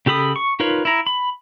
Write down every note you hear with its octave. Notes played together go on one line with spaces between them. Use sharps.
C#3 G4 A4 B5 D#6
C#6
D#4 F4 A#4 B4 C#5
E4 A#5
B5